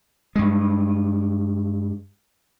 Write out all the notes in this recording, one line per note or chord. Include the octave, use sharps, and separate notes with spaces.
G2 G#3